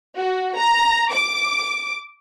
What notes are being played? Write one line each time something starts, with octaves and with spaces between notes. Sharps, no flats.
F#4
A#5
D6